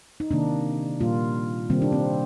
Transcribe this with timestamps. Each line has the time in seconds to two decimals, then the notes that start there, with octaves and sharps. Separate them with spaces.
0.20 D#4
0.31 C3 D#3 A#3 D4
1.00 A#2 G3 A#3 F4
1.70 C3 D#3 G3 A#3 C4
1.82 D4
1.92 C4